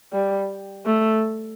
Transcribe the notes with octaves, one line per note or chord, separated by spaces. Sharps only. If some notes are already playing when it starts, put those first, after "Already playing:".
G3
A3